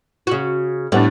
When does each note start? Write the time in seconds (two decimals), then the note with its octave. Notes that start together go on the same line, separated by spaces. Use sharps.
0.27 C#3 F#4
0.92 A2 G3 B3 D4